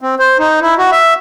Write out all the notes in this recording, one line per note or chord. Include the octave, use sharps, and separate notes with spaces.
C4
C5
D#4
E4
F#4
E5